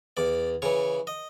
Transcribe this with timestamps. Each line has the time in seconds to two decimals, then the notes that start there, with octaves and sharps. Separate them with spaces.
0.17 E2 D5
0.62 C#3 E3 C#5
1.07 D#5